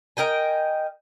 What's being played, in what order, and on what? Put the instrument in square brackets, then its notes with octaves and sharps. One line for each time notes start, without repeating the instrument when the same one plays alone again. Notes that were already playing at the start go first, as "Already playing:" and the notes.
[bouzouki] A#4 D#5 G5 G#5